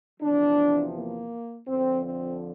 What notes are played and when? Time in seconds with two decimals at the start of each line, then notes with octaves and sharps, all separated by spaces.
0.20 E2 C3 F3 D4
0.94 A#3
1.67 F2 D3 F3 C4
2.04 C4